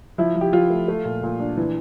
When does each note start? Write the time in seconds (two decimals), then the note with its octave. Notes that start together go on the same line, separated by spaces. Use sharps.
0.18 F3 E4
0.35 F3
0.41 G4
0.53 F3 F4
0.70 A3
0.88 A3
1.05 A#2
1.23 A#2
1.40 D4
1.57 E3